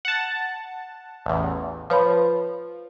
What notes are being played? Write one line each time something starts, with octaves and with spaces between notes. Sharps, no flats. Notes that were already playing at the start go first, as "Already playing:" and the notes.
F#5 A5
A1 E2
F3 B4 C#5 B5